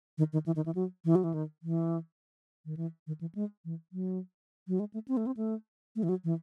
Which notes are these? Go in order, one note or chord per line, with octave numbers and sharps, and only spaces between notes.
D#3
D#3
E3
D#3
E3
F#3
E3
F#3
E3
D#3
E3
D#3
E3
D#3
E3
G#3
E3
F#3
F#3
G#3
A3
C4
A3
C4
A3
A3
E3
F#3
E3